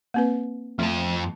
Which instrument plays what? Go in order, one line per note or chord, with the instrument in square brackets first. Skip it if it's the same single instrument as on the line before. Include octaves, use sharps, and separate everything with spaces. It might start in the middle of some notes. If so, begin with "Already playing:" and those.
[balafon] A#3 C4 B4
[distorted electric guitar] F2 A5 [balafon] A3